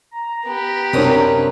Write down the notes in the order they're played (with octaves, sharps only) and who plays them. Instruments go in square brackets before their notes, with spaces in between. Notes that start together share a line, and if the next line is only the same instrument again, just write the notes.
[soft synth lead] A#5
[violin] B3 G4
[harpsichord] F#2 D#6 [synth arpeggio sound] C3 C4 D4